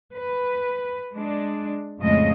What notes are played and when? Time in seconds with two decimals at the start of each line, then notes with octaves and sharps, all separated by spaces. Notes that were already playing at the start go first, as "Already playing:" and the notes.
0.13 B4
1.13 G#3 D4
2.02 F2 A2 C#3 F3 G#3 D#5